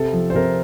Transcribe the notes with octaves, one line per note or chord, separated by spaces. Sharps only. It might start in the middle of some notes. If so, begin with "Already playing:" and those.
Already playing: C3 A4
F3
C5
C3 A#4